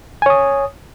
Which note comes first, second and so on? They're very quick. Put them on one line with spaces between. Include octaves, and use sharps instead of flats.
G#5 C#5 D#6